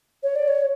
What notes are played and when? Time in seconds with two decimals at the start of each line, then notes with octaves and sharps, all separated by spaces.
0.23 C#5
0.35 D5
0.47 C#5
0.60 C#5